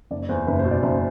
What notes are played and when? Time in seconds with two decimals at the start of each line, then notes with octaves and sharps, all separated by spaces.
0.11 F#1 D5
0.29 E2 C5
0.47 F#1 B4
0.59 C5
0.65 B2
0.71 D5
0.83 F#1 C5